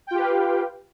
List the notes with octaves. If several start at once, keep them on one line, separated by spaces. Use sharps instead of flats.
F4 G4 B4 F5 G5